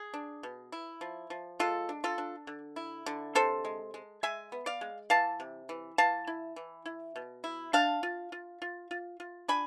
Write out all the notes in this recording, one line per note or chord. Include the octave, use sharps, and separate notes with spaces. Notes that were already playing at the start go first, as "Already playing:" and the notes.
Already playing: G#4
D4
B2
E4
F3
F3
G#3 F4 A4
D4
F4 A4
D4
D3
E4
D3
C3 A4 C5
G#3
G#3
G#3 E5 G#5
B3
D5 F5
G#3
E3 F5 A5
C3
E3
E3 F5 A5
E4
E3
E4
B2
E4
D4 F5 A5
F4
F4
F4
F4
F4
D4 G#5 B5